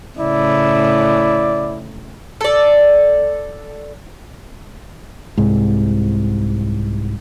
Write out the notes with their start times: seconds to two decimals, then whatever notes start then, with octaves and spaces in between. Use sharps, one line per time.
0.19 A2 C#3 E4 D5
2.41 A4 D5
5.37 C2 G#2